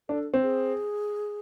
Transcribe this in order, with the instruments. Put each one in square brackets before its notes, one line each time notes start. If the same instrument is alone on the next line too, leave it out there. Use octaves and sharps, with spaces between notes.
[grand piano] D4 [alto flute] A4
[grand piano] C4
[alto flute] G#4